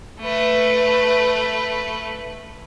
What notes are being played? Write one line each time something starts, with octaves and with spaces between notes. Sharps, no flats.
A3 B4